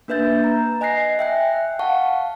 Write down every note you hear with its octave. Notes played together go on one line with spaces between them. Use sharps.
A#3 D4 B4 E5 G6 A6
A#5
D#5 G#5 F#6 A#6 C7
E5 G5 F#6
F5 F#5 A5 C#6